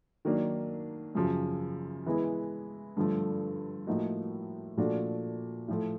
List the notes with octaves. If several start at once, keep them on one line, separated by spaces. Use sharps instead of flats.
D#3 F#3 A#3 D4
F#2 C#3 F3
E3 G#3 B3 E4
G2 D3 F3 A3
A2 F3 A#3 D#4 F#4
A#2 F3 A3 D4 F#4
A2 F3 A3